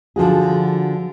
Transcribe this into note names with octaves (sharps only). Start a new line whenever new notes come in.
D3 F3 F#4 G#4